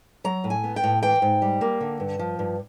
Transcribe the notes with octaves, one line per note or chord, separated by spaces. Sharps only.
F#3 A#5
A2
G#5
B3
G5
A2
E3 G5
G#2
G3
A#3
D3
G2
F3
G2